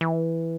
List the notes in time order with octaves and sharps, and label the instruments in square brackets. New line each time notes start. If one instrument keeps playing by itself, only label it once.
[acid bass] E3